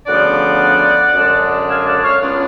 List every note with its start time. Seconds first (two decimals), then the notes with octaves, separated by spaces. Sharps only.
0.07 D2 C#3 F3 B3 D4 D5 F#5
1.15 F#2 D3 G#3 D4
1.68 F5 G#5
1.86 D5 F#5
2.03 C#5 F5
2.21 C#2 C#3 G#3 B3 D4 C#5 F5